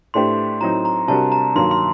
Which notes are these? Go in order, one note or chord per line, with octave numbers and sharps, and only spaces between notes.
A2 A3 D4 G4 C5 C6
A2 F#3 C4 D#4 A#5
A#5
C3 G3 D4 F#4 A#4 A5
A#5
G2 D#3 F#3 A#3 C6
C6